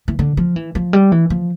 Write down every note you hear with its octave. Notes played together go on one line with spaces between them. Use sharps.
E3
D3
F3
E3
F3
G3
E3
F3